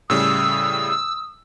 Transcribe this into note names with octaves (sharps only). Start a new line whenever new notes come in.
A2 C#3 G3 D#6 E6